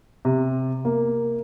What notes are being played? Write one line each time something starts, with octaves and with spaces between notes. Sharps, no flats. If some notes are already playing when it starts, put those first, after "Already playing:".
C3
A#3